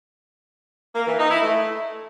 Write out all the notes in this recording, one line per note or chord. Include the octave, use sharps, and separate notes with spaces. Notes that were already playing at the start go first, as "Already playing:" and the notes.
A#3
E3
D#4
E4
A3